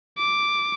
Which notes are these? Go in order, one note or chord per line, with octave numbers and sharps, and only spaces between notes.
D6